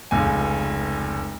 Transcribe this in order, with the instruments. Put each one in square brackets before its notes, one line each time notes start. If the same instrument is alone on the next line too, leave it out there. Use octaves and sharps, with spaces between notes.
[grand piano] F1 C#2 G#5